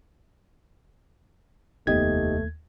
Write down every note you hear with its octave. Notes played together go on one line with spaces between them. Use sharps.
F1 D#2 A3 B3 D#4 G4 D#5 G#6